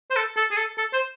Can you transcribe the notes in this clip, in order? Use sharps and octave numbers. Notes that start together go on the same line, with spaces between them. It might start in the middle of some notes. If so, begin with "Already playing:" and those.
C5
A4
A4
G#4
A4
A4
C5